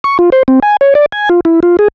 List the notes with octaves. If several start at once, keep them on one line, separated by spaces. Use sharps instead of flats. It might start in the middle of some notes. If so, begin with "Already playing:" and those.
C#6
F4
C5
C4
G#5
C#5
D5
G#5
F4
E4
F4
G#4